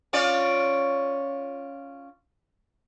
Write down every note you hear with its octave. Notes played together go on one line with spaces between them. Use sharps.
C#4 F4 D5